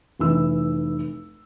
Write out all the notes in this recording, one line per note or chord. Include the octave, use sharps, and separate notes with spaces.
F1 E3 E6